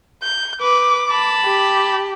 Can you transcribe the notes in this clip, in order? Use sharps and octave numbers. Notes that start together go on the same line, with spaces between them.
G6
B4 D6
A5 B5
G4